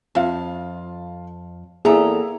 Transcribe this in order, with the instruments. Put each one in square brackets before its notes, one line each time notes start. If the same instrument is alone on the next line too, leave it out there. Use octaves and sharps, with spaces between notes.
[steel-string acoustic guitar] F2 [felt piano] F4 F5
[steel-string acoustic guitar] E2 A4 A#5 [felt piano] A#3 E4 E5 [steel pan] G#4